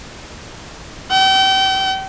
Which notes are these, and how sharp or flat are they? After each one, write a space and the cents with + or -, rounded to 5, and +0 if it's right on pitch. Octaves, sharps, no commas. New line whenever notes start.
G5 -35